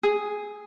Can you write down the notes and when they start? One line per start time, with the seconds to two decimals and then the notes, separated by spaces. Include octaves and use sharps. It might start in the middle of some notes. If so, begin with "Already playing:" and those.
0.03 G#4